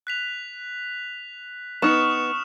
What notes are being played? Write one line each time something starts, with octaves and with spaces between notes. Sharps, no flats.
F#6 B6 F7
B3 D#4 B4 C#6 D#6 F6 E7